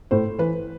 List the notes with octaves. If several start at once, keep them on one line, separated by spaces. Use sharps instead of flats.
A2 C5
E3 B4